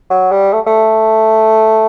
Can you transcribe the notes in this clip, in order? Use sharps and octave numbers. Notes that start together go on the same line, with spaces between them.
F#3
G3
A3
A3